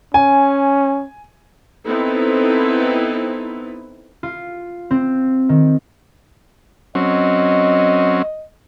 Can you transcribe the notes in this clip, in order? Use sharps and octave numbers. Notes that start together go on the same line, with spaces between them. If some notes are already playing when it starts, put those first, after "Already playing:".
C#4 G#5
B3 C4 D#4 E4 A4 B4
F4
C4
D#3
F#3 C4 C#4 D#5